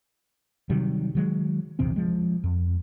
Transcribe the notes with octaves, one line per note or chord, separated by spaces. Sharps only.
C3 D#3 F#3 G3
D#3 F#3 G#3
A#1 E2 C3 C4
F3 G#3
F2